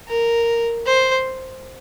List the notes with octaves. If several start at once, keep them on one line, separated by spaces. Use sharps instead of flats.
A#4
C5